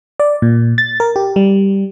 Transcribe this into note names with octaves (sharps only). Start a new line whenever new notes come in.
D5
A#2
A6
A#4
G4
G3